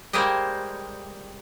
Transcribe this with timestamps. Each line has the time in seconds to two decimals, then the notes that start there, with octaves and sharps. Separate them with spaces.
0.13 G3 G#3 A#3 C5 D#5